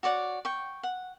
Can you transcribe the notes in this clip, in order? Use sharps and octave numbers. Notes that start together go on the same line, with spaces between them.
F#4 C#5 D5 F#5
G5 C#6
F#5